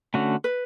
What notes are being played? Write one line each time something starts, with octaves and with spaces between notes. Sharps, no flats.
D3 A3 C#4 F#4
B4